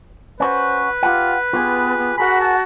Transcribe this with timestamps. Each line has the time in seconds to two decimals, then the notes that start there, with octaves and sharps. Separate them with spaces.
0.40 C#4 F#4 B4 C5
1.03 F4 G4 F#5
1.53 B3 F4 G4 G#4
1.98 B3
2.18 F#4 G#4 A#4 F#5 B5
2.41 A5